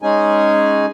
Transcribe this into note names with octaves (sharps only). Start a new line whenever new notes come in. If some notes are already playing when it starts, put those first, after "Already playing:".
G#3 C#4 D#4 G#4 G#5